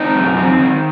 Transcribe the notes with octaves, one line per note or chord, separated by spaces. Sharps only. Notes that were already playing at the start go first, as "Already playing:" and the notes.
Already playing: C4 D#4
F#2
C4
D#3